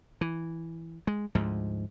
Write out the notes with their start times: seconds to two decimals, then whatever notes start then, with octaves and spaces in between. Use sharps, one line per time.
0.21 E3
1.07 G#3
1.35 D2 G#2 F3